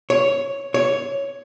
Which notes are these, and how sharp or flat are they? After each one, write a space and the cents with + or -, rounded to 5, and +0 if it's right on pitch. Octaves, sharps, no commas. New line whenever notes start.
C#5 +0
C#5 +5